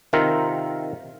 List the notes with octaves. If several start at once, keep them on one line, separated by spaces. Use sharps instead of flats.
C3 D#3 F4 A#4 E5